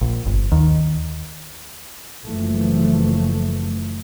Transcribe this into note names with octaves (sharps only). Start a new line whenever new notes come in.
A#1
G1
D#2
F#1 F#2 E3 F3 A3